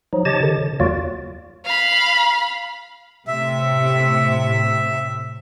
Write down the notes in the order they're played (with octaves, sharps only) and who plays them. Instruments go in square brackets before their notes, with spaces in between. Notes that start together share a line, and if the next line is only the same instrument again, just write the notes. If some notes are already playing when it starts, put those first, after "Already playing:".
[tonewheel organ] F3 F#3 D#4
C#3 G4 C#5 D#5 A5 A6
D3 D#3
C#3
E2 F#3 A#3 F4 F#4 D5
[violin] F5 B5
[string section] A2 C3 [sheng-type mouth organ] E5